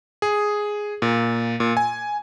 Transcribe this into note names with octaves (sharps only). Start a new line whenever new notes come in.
G#4
A#2
A#2
G#5